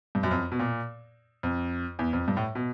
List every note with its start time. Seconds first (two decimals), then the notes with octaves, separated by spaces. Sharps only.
0.15 G2
0.23 F#2
0.31 F2
0.52 B2
0.59 A#2
1.43 F2
1.99 E2
2.13 F2
2.28 G2
2.37 A2
2.55 B2